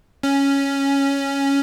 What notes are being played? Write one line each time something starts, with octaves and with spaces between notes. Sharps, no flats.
C#4